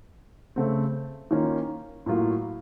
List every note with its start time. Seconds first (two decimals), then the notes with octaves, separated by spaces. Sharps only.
0.56 C#3 A3 C4
1.31 D#3 A#3 C#4 F4
2.06 A2 F#3 A#3 F4